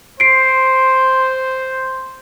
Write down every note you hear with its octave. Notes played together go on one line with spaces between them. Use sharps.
C5 C7 D7